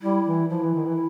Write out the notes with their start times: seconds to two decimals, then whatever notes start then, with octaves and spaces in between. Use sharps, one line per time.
0.02 G3 E4
0.26 E3
0.50 F3 E4
0.63 E3
0.75 D#3
0.86 E3